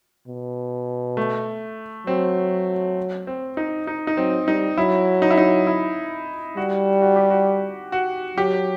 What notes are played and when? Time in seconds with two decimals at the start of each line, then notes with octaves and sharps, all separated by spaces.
0.27 B2
1.17 A3
2.07 F#3 C4
3.27 C4
3.57 D#4
3.87 D#4
4.07 D#4
4.17 F#3 C4
4.48 G3 D#4
4.77 F#3 E4
5.22 D#4
5.30 E4
5.38 D#4
5.67 E4
6.57 G3 F#4
7.02 F#4
7.16 G4
7.30 F#4
7.92 F#4
8.37 F#3 G4